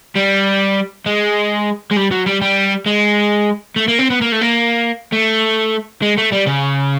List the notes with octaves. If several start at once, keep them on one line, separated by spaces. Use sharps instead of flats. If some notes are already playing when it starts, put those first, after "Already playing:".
G3
G#3
G#3
G3
F#3
G3
G3
G#3
A3
A#3
C4
B3
A#3
A3
A#3
A3
G#3
A3
G3
C#3